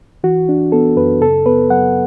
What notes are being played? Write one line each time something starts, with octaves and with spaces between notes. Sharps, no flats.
E3 F#4
D4
B3 A4
F#2 B4
C#3 A4
B3 B4
F#3 F#5